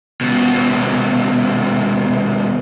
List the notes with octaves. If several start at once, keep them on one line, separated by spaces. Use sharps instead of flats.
D#2 B2